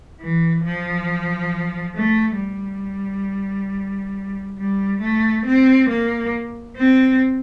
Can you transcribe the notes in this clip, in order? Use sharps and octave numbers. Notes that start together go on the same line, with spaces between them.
E3
F3
A3
G3
G3
A3
C4
A#3
C4